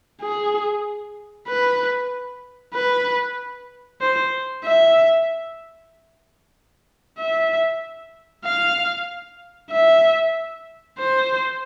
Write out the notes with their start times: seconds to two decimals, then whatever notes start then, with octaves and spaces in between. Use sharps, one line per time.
0.21 G#4
1.47 B4
2.74 B4
4.01 C5
4.64 E5
7.19 E5
8.46 F5
9.71 E5
10.99 C5